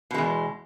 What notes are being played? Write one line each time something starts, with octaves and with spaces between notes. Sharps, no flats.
E2 B2 G#3